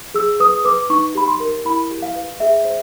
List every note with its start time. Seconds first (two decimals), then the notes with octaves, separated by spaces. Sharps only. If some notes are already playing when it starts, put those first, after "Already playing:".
0.14 G#4 E6
0.40 B4 D#6
0.65 B4 D6
0.90 D#4 C#6
1.15 G4 B5
1.28 C6
1.40 A#4
1.65 E4 B5
1.91 G4
2.02 F5
2.15 B4
2.40 G#4 E5
2.65 C5